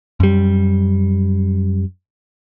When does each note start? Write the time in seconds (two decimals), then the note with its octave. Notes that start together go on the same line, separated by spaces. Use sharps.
0.20 F#2 G3